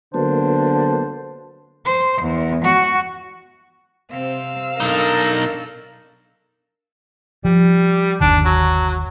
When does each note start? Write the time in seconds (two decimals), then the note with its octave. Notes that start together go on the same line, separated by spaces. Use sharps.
0.14 D3 F#3 A#3 B3 D4 C5
1.85 C5
2.21 E2
2.64 F#4
4.11 C3 C4 F5 E6
4.80 B1 D4 D#4 A4 A#4
7.45 F3 G3
8.21 G1 D#2 D#3 D4
8.45 F#3